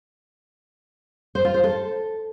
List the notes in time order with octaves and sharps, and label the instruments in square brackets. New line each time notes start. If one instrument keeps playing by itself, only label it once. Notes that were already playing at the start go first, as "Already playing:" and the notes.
[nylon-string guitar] C5
F4
C5
A4